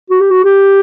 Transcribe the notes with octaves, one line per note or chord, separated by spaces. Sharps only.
F#4
G4
F#4
G4